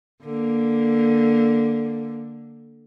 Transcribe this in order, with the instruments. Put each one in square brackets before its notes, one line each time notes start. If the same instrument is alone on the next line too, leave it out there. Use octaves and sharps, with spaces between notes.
[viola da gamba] D3 A#3